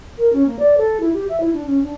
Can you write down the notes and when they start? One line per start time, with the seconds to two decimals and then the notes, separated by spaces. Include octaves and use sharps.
0.18 A#4
0.32 C#4
0.46 A#3
0.59 D5
0.77 A4
1.00 E4
1.13 G4
1.29 E5
1.40 E4
1.53 D4
1.66 C#4
1.83 D4